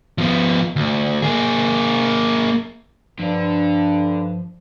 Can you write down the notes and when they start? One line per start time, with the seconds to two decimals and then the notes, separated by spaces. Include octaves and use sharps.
0.18 F3 B3
0.76 D2
1.22 A#3 G#4
3.19 G2 D3 F3 D4